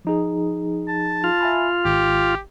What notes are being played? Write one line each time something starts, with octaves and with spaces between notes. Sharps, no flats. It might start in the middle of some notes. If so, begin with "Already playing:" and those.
F3 D#4 G#4
A5
F4
E5 G#5 B5
G#1 G4